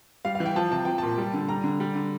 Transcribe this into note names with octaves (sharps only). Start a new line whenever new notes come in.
G3 F5
F5
E3
G5
F3 A5
C3 A5
F3 G5
A#2 A5
G3
D3
G3 A#5
D3
G3
D3